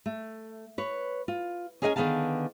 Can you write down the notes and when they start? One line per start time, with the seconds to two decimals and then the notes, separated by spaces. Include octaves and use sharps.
0.06 A3
0.78 B4 C#5
1.28 F4
1.82 C#4 G#4 A#4 D#5 F#5 G#5
1.96 D3 D#3 B3 G#4 F5 A5